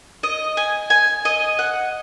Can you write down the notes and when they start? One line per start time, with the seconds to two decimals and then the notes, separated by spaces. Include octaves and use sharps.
0.23 D#5
0.57 G#5
0.90 G#5
1.25 D#5
1.59 F#5